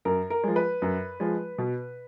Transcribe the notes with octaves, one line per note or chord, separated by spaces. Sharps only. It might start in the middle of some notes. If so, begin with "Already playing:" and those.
F#2 A#4
A#4
F3 G#3
B4
F#2
F3 G#3
B2